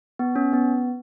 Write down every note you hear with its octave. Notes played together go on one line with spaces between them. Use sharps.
B3
C#4
B3